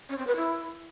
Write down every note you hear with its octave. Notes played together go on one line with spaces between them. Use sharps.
C#4
C4
B4
E4